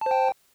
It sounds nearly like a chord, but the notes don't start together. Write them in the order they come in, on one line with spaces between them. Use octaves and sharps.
A5 C5 G5